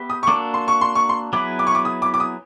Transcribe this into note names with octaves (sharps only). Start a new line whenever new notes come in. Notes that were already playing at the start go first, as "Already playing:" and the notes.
Already playing: B3 G4 B4 E5
D#6
C#6
A#3 D4 F#4 A4 D6
C6
C#6
C6
C#6
C6
F#3 B3 E4 G#4 B4 D6
D6
C#6
D6
D#6
D6
D6
D#6